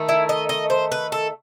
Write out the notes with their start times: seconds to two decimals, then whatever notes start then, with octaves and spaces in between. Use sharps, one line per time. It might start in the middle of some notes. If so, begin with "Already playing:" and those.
Already playing: D#3 A3
0.09 E4
0.29 D#5
0.49 D#5
0.70 C5
0.92 B4
1.12 A4